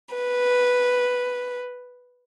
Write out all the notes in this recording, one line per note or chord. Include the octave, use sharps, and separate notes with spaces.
B4